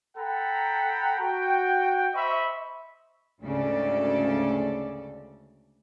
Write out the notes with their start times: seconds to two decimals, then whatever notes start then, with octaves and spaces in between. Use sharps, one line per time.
0.17 A4 F#5 G5 A#5 B5
1.20 F#4 G5
2.14 C5 D#5 E5 B5 C#6
3.42 D2 G#2 C#3 A4 D5